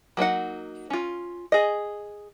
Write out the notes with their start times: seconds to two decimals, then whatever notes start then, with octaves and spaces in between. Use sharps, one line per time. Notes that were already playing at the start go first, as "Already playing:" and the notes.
0.17 F#3 A#3 D#4 F#5
0.90 C#4 F4
1.52 G#4 D#5